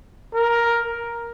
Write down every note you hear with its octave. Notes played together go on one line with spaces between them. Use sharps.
A#4